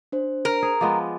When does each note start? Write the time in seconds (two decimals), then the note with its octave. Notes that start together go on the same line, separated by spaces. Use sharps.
0.12 D4 C5
0.45 A#4
0.62 G#4
0.81 F3 G#3 B3 D6